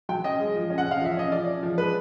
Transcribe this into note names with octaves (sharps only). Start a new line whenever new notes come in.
F#3 G5
C#4 D#5
G#3
F3
C#4
F#5
C#4
F5
F3 E5
C#4 D#5
F3 D5
C#4
F3
G#3 B4